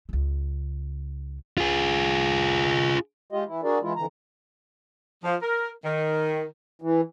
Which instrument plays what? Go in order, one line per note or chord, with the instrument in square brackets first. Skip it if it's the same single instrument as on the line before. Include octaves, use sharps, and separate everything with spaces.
[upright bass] C#2 C#3
[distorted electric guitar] F4 G#4
[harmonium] G#3 F4 G4 D#5
E3 E4
D4 F#4 G#4 A#4 D5
E3 G#3 E4 F4
F2 D3 E3 A#5
[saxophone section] F3
A#4
D#3
[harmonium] E3